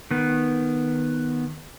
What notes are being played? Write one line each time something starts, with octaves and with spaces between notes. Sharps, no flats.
D#3 B3